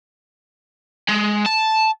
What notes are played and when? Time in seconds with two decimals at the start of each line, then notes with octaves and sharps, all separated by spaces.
1.08 G#3
1.46 A5